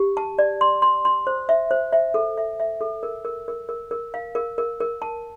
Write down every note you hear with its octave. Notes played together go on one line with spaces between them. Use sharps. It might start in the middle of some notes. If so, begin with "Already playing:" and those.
Already playing: G4
A5
D5
C6
C6
C6
C5
E5
C5
E5
A4
E5
E5
A4
A#4
A#4
A#4
A#4
A#4
F5
A#4
A#4
A#4
A5